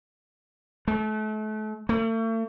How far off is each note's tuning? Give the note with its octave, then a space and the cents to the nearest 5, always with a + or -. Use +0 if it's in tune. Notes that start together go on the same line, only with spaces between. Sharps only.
A3 -35
A3 +40